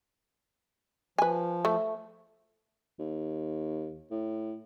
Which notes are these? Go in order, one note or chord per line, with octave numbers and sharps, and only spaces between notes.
F3 B4 G#5
A3
D#2
A2